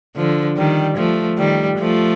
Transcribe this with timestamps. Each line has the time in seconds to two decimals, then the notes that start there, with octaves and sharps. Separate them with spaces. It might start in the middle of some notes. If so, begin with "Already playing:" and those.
0.16 D3 F3
0.57 D#3 G3
0.97 F3 A3
1.38 D#3 G3
1.78 F3 A3